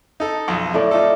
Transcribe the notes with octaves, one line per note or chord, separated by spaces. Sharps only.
D#4 A4
B1 F2
A2 A3 D5
D#4 F4 A4